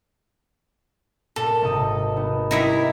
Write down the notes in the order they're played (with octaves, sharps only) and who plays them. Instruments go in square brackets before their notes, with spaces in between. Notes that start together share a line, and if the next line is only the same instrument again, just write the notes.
[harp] A#2 [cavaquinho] A4
[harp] G#1 C3 D#5
B3 D#4
[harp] G3 [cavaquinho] D#4 E4 E5